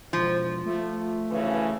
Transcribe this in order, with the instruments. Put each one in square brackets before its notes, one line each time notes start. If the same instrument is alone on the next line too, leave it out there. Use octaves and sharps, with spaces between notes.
[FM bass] E1 [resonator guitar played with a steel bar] F3 [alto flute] C5
[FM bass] A3 [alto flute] F4
[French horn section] D2 C#3 E3 [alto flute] B4